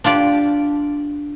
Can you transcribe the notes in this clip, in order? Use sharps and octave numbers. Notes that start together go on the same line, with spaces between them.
D4 F4 G4 D5